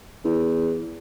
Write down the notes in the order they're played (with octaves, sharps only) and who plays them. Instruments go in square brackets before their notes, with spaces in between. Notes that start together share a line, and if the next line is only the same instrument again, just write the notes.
[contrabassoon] E2